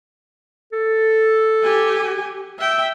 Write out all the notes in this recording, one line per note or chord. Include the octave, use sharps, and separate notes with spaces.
A4
G4 G#5
E5 G5